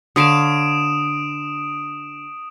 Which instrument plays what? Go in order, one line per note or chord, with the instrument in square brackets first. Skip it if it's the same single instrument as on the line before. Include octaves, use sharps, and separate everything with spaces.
[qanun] D3 C#5 F5 [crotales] D#6 D7 E7